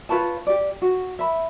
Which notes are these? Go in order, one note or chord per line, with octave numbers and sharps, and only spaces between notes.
F4 B4 C#5 A5
G4 D5
F#4
E5 B5